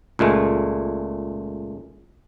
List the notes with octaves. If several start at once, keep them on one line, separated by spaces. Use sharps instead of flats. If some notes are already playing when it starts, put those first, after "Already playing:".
C#2 A#2 G#3 A3